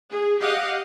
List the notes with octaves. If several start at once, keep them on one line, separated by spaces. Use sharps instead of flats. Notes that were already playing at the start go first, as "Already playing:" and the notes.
G#4
G4 D#5 F5 F#5